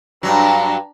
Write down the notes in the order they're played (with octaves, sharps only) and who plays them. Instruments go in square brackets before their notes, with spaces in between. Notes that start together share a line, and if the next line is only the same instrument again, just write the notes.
[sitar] G2 F#3 [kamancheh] D4 A#5